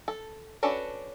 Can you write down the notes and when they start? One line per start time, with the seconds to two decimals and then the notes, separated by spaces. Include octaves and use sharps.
0.08 A4
0.63 C#4 D4 F#4 A4 B4